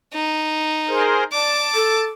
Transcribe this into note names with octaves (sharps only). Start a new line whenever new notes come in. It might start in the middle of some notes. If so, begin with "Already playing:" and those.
D#4
G#4 A#4 C5
D5 A5 D6
A4